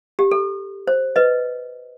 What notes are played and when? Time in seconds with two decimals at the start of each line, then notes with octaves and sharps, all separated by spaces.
0.19 G4
0.31 A4
0.87 C5
1.16 B4 D#5